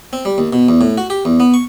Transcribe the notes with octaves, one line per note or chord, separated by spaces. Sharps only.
C4
G3
D#2
B2
E2
A2
F#4
G4
E2
B3
C#6